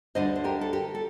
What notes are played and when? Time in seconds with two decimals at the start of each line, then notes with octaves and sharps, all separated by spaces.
0.15 D2 D3 G3 D4 C5 D#5
0.36 C5
0.44 G4 A#4
0.61 A4
0.73 G4 A#4
0.95 A4